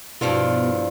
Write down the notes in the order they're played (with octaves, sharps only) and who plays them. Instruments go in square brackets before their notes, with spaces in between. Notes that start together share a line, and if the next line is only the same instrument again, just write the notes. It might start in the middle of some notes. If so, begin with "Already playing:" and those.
[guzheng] G2 F3 F4 [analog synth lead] B2 [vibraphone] E4 D5 F5